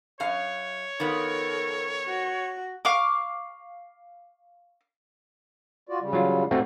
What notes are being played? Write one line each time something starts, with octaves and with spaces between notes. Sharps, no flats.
F#2 C#5 F5
D#3 F3 B3 A4 A#4
F#4
F5 C#6 D6
F4 F#4 D5
C#3 G3
F#3 F4
A3 C4 F#4